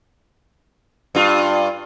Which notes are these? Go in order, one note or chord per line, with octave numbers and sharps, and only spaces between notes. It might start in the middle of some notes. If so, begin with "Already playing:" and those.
G2 F4